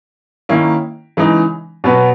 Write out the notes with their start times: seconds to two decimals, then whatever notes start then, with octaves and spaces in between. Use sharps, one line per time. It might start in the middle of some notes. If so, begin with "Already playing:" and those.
0.49 D#3 A#3 C#4 E4
1.17 C#3 E3 G#3 D#4
1.84 B2 F#3 B3 F#4 B4